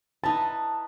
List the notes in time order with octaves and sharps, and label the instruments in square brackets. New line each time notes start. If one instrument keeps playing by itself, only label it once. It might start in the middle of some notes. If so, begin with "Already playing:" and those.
[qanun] D#4 E4 B4 [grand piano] A5